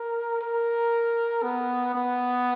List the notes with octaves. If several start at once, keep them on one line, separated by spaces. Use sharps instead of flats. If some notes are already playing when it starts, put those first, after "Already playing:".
Already playing: A#4
A#4
B3
B3